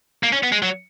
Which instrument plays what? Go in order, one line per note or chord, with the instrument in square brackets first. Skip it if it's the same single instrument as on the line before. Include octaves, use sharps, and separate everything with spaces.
[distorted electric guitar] A#3
C#4
B3
G#3
F#3